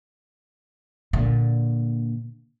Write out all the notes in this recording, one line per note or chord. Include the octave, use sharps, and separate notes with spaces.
A#2 D3